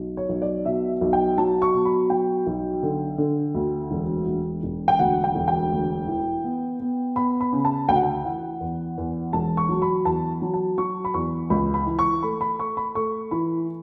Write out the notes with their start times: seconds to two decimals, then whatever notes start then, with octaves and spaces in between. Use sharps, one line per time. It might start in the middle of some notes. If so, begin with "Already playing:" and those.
Already playing: B1
0.17 C#5
0.29 B1
0.42 D5
0.65 B2 E5
1.01 B1
1.13 G5
1.38 F#3 A5
1.62 C#6
1.74 B2
1.85 B5
2.10 F#3 G5
2.47 B1
2.83 D3
3.18 D3
3.54 D2
3.91 E1
4.27 E1
4.63 E1
4.88 G5
4.99 D2 F#5
5.24 G5
5.35 E1
5.48 G5
5.72 D2
6.08 E3
6.44 B3
6.80 B3
7.16 B3 B5
7.41 B5
7.53 C#3
7.65 A5
7.88 D2 G5
7.96 F#5
8.03 G5
8.25 E3 F#5
8.61 E2
8.98 E2
9.33 E1 A5
9.57 C#6
9.69 F#3
9.82 B5
10.05 E2 A5
10.42 F#3
10.54 A5
10.78 F#3 C#6
11.05 B5
11.14 E2 C#6
11.50 C#2 B5
11.74 B5
11.87 E3
11.99 C#6
12.23 A3 B5
12.41 B5
12.59 A3 C#6
12.77 B5
12.95 A3 C#6
13.31 E3 B5